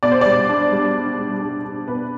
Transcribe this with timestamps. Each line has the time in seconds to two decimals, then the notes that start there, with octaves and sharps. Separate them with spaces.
0.03 B2 D5
0.12 C5
0.21 G3 D5
0.49 D4
0.72 G3
0.95 D4
1.19 G3
1.42 D4
1.65 D4
1.88 B2 B4